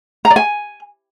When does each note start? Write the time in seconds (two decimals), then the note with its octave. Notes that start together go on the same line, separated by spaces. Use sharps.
0.25 A#5
0.30 D5
0.36 G#5